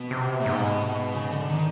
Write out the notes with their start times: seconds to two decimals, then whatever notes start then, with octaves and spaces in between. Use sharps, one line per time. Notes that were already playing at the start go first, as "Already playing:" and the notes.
Already playing: B2
0.11 C3
0.40 A#2
0.46 G#2 B2
1.14 C#3
1.30 D3
1.48 D#3